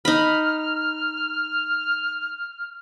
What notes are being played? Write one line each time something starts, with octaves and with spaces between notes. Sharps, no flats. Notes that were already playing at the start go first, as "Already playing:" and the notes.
D#4 B5 F6